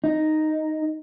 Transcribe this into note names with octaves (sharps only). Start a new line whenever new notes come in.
D#4